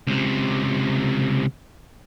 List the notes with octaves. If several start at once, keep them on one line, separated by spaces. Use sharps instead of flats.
C#2 C3